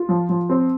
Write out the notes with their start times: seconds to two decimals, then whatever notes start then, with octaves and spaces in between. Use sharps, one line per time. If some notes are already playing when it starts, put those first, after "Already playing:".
Already playing: F4
0.09 F3
0.29 F3
0.49 C4